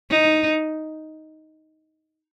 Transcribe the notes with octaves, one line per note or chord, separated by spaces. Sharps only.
D#4